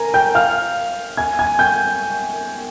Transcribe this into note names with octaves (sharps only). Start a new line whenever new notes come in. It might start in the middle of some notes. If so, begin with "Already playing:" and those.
Already playing: A#4 G#5 A#5
G5 G6
F5 F6
G#5 G#6
G#5 G#6
G5 G6